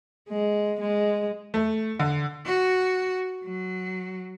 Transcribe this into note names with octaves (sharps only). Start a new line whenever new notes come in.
G#3
G#3
A3
D3
F#4
F#3